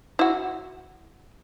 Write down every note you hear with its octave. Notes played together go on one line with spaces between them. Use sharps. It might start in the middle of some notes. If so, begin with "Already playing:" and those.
E4 F#4